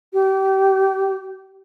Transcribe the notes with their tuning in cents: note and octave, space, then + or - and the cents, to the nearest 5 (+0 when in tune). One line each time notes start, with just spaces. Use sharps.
G4 -30